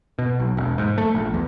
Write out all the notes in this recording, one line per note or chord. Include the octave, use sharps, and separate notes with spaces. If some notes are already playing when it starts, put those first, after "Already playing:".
B2
B1
E1
G#2
A3
A#1
E2